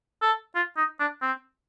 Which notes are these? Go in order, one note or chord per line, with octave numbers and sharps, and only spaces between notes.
A4
F4
D#4
D4
C4